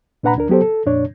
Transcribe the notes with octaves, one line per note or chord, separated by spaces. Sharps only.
A#2 D4 B4 F#5 A#5 B5
D2 D4 A#4
F#3 B3 G4 A4 C5
A4
F2 A#2 D4 C#5